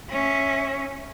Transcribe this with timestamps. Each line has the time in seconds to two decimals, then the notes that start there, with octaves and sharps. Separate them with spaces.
0.10 C#4 E5